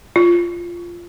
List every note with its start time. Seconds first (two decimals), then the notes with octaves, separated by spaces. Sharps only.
0.16 F4